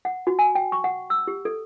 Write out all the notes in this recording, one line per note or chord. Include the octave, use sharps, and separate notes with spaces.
F#5
F#4
G#5
G5
C#6
F#5
E6
G4
A4